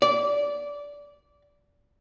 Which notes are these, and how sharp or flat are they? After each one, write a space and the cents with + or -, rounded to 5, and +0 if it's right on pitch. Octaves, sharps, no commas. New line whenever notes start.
D5 -20